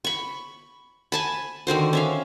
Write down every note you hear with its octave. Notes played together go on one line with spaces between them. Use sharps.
B5 C#6
G#5 A5 B5
D3 D#3 F#4 C5
C#4 E5 F5